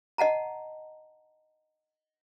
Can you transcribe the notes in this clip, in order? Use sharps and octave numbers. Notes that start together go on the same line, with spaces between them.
D#5 F#5 A5 A#5